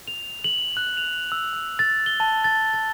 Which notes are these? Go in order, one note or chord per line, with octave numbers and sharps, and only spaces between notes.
F7
F#7
F#6
F7
E6
F#6
A6
G7
A5
A6
A6